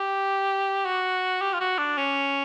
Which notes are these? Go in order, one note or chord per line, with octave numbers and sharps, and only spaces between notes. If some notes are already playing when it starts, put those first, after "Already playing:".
Already playing: G4
F#4
G4
F4
F#4
D4
C#4